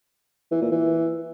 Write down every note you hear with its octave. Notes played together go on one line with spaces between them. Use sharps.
E3
A#2
E3